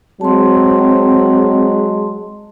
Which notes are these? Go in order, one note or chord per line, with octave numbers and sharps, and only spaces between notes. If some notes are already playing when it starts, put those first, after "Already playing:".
F#3 G#3 C4 A5 C6